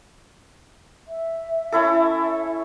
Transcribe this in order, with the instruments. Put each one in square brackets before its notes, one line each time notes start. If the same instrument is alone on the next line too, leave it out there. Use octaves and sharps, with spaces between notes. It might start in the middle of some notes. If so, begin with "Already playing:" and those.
[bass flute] E5
[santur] C#4 E4 A4